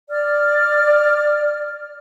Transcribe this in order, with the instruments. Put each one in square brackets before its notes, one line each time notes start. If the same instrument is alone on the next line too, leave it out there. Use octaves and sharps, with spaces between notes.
[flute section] D5 F6